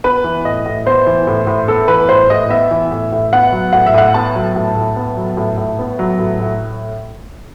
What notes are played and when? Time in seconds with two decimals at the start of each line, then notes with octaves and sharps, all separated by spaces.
0.04 B3 B4
0.24 E3
0.45 A2 D#5
0.66 A2
0.86 B3 C5
1.07 E3
1.27 A2
1.47 A2
1.68 B3 A4
1.88 E3 B4
2.09 A2 C5
2.30 A2 D#5
2.50 B3 E5
2.71 E3
2.91 A2
3.12 A2
3.33 B3 F#5
3.52 F#3
3.73 A2 F#5
3.86 E5
3.94 A2 F#5
4.14 B3 A5
4.35 F#3
4.56 A2
4.75 A2
4.96 B3
5.17 F#3
5.37 A2
5.58 A2
5.79 B3
5.99 F#3
6.19 A2
6.40 A2